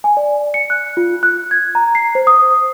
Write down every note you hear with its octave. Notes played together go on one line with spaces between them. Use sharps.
G#5
D5
C#7
F#6
F4
F#6
G#6
A#5
C7
C5
D#6